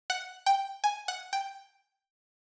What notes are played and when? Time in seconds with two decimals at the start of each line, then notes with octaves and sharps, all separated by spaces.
0.10 F#5
0.46 G5
0.84 G#5
1.08 F#5
1.33 G5